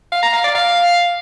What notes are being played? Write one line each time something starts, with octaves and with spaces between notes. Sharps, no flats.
F5
A#5
F5
D5
F5